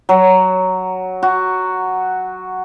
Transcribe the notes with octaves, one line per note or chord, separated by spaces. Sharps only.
F#3
F#4